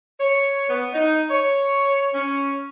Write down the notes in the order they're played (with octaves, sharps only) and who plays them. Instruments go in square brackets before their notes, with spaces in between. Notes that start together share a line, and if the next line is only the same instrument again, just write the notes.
[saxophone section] C#5
B3
D#4
C#5
C#4